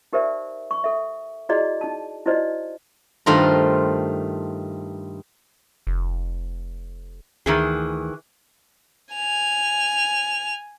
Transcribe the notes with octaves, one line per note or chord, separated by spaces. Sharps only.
D#4 G4 A#4 C5 D5 E5
C#6
A4 E5
E4 F#4 G#4 D5 D#5 A#5
D#4 A5
D#4 E4 F#4 C5 D5 D#5
G2 D#3 A3 F4 C5 A#5
F1
D2 D#3 E3 G#4
G#5 F7